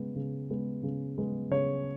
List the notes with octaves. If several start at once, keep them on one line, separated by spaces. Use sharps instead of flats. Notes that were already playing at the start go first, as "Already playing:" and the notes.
Already playing: C#3 G#3 B3
C#3
G#3 B3
C#3
G#3 B3
C#3 C#5